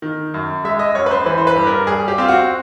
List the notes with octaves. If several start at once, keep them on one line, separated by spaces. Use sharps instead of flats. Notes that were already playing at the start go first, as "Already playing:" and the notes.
D#3
F#2
G#3 E5
D#5
F#2 C#5
B4
C5
E3 B4
C5
B4
G2
A#4
G3 G#4
G4
C4 F4
F#4